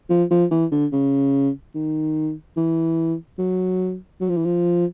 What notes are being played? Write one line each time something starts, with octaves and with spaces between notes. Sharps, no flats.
F3
F3
E3
D3
C#3
D#3
E3
F#3
F#3
F3
E3
F3